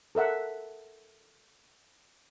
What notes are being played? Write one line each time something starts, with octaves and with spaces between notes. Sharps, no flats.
A4 A#4 E5 F#5